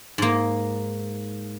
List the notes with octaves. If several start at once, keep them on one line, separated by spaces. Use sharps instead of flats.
G#2 A#3